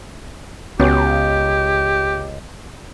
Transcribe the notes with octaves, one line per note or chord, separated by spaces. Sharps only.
C#2 B3 C#4 F#4 G4